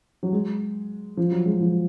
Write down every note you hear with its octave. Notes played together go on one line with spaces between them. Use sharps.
F#3
G#3
F3
F#3
G#3
F3